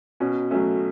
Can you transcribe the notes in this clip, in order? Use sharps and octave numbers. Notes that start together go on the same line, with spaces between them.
B2 C#4
F#3 A3 C#4